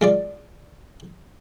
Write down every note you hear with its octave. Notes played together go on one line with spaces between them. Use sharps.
G#3 F4 D5